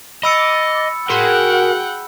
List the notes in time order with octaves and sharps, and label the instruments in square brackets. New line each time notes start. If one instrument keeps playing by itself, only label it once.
[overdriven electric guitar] D#5 [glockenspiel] B5 E6 C#7 [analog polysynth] D6 A6
[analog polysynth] F#4 G#4 [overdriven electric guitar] A#4 C6 [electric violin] F#5 G5